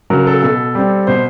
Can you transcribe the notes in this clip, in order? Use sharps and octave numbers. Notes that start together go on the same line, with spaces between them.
C#3 F#3 A#4
A4
B2 A4
G3 C4
B2 C5